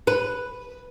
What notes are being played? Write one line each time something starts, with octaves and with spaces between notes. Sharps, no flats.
B4